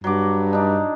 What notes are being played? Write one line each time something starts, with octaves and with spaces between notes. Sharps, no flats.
G2 F#3 D6
D4 D#4